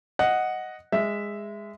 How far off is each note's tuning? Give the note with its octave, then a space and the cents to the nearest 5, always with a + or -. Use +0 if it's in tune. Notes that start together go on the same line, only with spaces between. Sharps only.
D#5 +0 F#5 +0
G#3 -15 E5 +0